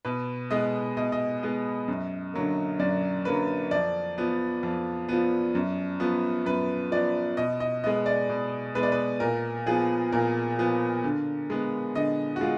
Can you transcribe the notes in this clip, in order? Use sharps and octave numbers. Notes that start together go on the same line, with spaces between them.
B2 B4
G#3 B3 D#5
B2 D#5
D#5
G#3 B3
F#2
D3 F#3 A#3
F#2 D5
D3 F#3 A#3 B4
F2 D5
F3 B3
F2
F3 B3
F#2
F3 B3
F#2 B4
F3 B3 D5
B2 D#5
D#5
G#3 B3 D#5
D5
B2
G#3 B3 B4
D5
B4
A#2 A#4
F3 B3 G#4
A#2 A#4
F3 B3
D3
G#3 B3
D3 D#5
F#4
G#3 F4